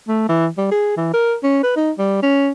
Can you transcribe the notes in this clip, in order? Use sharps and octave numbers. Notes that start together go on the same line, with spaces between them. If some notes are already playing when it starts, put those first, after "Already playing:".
A3
E3
G3
G#4
E3
A#4
C#4
B4
D#4
G3
C#4